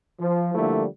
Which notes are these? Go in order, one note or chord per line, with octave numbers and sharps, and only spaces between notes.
F3
D3 F3 G3 A3 A#3 E4